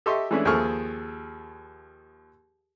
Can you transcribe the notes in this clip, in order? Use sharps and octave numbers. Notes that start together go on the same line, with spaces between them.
G4 A4 D#5 E5 C6 C#6
E3 G#3 A3 C#4 D4 E4
D#2 F3 G#4 A4 C#6 F6